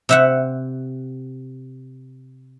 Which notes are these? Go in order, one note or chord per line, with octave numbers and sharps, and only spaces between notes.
C3 E5 F#5